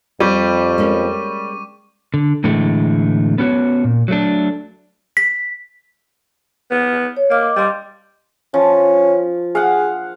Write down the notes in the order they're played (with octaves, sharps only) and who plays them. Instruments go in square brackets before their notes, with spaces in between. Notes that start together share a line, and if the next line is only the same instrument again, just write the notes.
[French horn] F2 [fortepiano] G3 [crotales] C#6 D6 D#7
[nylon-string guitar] G#3 A#3 C#4
[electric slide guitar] D3
A2 D3 E3 G#3 A3
B3 C#4 F#4 C#5
A#2
F#3 A3 D4
[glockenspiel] B6
[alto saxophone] B3
[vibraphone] C#5
[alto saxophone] A#3 [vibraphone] D#5 D6
[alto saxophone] G3 [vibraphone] D#5 C6
[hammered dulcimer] F3 [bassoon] C#4
[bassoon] G#4 [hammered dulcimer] F5 F#5